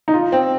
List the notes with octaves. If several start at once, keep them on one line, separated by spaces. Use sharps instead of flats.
D#4
F4
C4